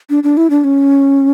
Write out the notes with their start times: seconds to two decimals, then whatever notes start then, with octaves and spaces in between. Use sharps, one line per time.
0.10 D4
0.24 D4
0.37 E4
0.50 D4
0.64 C#4